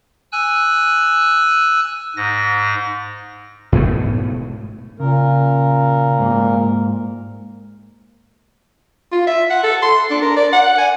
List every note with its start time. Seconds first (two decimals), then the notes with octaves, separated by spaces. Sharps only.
0.32 G#5 E6 F#6
2.16 G#2 A#6
3.72 G#2 B2 A3
5.00 A#2 C#3 A#4
6.19 G#2 A#3
9.12 F4
9.27 E5
9.50 F#5
9.63 A4
9.82 C6
10.10 D4
10.22 A#4
10.36 D5
10.53 F#5
10.78 G#5